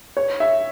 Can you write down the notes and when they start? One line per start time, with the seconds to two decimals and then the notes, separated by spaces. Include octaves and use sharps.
0.17 C#5
0.40 E5